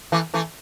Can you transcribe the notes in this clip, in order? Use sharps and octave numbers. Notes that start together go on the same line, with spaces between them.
E3 A3
E3 A3